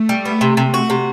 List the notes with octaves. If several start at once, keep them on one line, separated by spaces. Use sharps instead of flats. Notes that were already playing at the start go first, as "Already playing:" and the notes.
Already playing: A3
G3
B3
C3
C3
F#4
C3